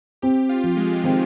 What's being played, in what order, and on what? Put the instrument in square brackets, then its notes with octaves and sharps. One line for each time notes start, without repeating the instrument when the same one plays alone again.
[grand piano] C4 [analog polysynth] G4
[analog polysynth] F4
[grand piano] F3
[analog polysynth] G#3
[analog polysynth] D#3 [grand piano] C4